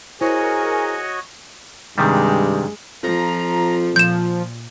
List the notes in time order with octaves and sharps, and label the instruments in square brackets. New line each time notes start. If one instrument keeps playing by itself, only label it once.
[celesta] E4 C5 [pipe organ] F#4 C#5 D#5 [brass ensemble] G#4 A#4 [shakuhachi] G#5
[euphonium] G2 [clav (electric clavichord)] C3 D#3 G3 [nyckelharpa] G#3
[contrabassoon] F2 [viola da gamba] F3 [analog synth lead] A#5
[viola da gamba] A#2 [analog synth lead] F3 [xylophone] G6 E7